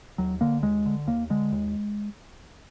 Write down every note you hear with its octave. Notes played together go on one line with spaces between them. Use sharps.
D#2 F#3
D3 A#3
D#2 G#3
D3
D#2 A#3
D3 G#3
D#2